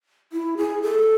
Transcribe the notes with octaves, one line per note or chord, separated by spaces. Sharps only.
E4
G#4
A4